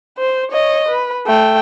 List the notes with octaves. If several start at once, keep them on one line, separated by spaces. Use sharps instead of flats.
C5
C#5 D#5
B4
A3 G5